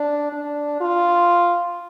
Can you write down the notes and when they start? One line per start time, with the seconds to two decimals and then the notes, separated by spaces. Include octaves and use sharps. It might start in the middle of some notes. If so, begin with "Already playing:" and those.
Already playing: D4
0.32 D4
0.80 F4